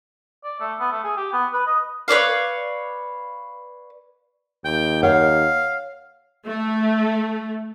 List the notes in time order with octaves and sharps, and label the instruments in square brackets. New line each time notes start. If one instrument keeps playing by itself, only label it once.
[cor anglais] D5
A3
B3
A3
G#4
G4
B3
B4
D#5
[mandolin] B4 C#5 D5 F5
[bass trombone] D#2 [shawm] G5
[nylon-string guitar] C#5 F#5 [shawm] F5
[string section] A3